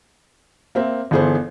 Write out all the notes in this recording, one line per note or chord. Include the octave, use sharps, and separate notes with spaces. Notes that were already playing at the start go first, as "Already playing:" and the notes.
A#3 C4 E5
G1 E3 B3 G#4 A4 C5